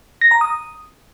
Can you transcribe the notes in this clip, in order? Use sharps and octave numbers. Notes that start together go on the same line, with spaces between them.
A#6
A#5
D#6